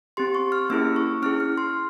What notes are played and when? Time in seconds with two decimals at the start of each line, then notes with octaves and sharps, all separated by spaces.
0.17 C4 G4 C6
0.35 C#6
0.52 F6
0.70 A#3 C#4 E4 G#4 E6
0.96 C#6
1.22 C#4 E4 G#4 F6
1.40 F6
1.58 C6